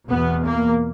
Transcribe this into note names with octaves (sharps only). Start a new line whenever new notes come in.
E2 B2 B3
A#3